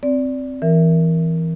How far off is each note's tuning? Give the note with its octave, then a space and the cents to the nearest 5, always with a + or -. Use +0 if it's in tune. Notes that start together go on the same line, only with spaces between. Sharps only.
C4 +0 D5 -15
E3 +0 A#4 +0 E5 +0